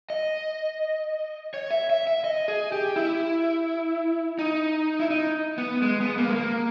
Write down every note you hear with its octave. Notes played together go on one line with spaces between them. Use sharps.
D#5
C#5
E5
E5
E5
D#5
G#4
G4
E4
D#4
E4
D#4
B3
G#3
B3
A#3
G#3
A#3